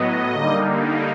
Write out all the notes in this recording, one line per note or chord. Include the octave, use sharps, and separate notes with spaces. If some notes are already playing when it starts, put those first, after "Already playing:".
Already playing: A2 F#3 B3 D#5
D3 G3 A#3 D#4